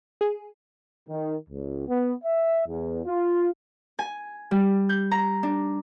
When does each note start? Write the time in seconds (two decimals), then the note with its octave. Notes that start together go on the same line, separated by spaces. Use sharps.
0.21 G#4
1.09 D#3
1.49 C#2
1.88 B3
2.24 E5
2.67 E2
3.06 F4
3.99 G#5
4.51 G3
4.89 G6
5.11 A#5
5.43 D4